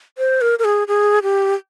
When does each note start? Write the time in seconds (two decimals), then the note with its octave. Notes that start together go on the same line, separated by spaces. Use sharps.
0.18 C5
0.41 A#4
0.59 A#4
0.64 G#4
0.88 G#4
1.23 G4